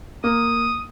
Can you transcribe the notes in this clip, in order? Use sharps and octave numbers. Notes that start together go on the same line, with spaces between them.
A#3 D#6